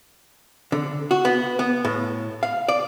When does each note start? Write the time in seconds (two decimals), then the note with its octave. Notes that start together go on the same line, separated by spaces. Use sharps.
0.72 D3
1.11 F#4
1.25 B3
1.59 B3
1.85 A2
2.43 F5
2.68 D5